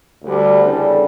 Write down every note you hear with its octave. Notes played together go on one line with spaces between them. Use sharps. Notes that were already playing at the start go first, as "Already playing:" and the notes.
D2 D3 G3
E2 C#3 G3 D4 A4